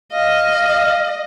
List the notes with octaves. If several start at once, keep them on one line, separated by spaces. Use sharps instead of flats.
D#5 F5